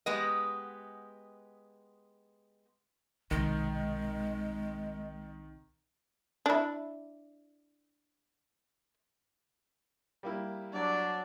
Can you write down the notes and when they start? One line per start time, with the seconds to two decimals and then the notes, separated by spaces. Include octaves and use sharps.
0.06 G#3 B3 G4 D#5
3.31 B1 C3 D#3 G#3
6.46 D4 E4
10.23 G3 A#3 E4
10.73 F#3 D4 D5